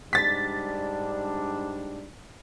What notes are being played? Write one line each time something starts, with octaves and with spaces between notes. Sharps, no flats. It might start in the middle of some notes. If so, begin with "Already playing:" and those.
G#2 G3 D4 A6 B6